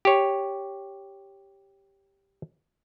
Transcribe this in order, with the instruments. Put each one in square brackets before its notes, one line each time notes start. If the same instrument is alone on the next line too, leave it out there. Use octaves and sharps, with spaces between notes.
[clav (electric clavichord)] G4 C#5